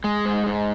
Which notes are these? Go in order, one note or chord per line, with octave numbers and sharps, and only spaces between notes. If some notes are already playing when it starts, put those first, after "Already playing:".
G#3
G#2
G#2